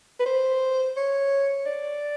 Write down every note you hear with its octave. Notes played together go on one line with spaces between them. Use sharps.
B4
C5
C#5
D5